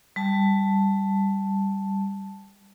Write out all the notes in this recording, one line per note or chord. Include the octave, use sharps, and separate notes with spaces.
G3 A5